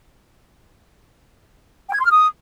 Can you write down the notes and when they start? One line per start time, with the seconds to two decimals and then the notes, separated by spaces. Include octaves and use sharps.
1.88 G5
1.94 G#6
2.00 C6
2.06 F6
2.11 D#6